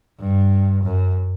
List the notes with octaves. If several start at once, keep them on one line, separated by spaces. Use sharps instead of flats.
G2
F#2